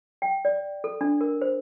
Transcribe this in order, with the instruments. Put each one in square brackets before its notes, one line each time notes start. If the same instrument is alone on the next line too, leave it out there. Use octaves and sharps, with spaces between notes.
[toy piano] G5
D5
A4
D4
A#4
C5